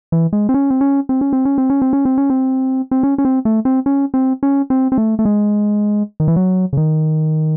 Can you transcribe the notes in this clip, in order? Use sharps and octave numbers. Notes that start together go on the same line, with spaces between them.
E3
G#3
C4
C#4
C4
C#4
C4
C#4
C4
C#4
C4
C#4
C4
C#4
C4
C#4
C4
C4
C#4
C#4
C4
A3
C4
C#4
C4
C#4
C4
C4
A3
A3
G#3
D#3
E3
F#3
C#3
D#3